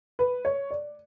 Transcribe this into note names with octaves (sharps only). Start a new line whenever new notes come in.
B4
C#5
D5